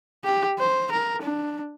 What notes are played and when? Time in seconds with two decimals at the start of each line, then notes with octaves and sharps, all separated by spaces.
0.25 G4
0.59 C5
0.92 A#4
1.22 D4